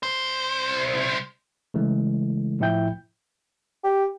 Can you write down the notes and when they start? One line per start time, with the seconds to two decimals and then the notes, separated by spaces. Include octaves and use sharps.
0.03 C2 C5
1.74 C#3 E3 G#3 A3
2.60 A2 F3 E4 E5 G5 G6
3.84 G4